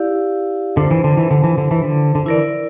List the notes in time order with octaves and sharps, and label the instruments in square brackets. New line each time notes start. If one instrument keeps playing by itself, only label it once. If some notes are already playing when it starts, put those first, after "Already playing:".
Already playing: [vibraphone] E4 G4 D5 F5
[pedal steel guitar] D3 [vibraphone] D4 F4 C5
[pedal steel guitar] E3
D3
E3
D3
E3
D3
E3
D3
D3
[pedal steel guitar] E3 [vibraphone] E4 A#4 D5